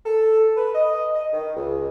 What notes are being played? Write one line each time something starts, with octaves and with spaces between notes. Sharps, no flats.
A4
B4
D#5
D#5
D#3
C#2